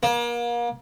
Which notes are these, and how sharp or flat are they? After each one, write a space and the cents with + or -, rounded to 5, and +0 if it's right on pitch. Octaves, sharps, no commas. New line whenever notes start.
A#3 +35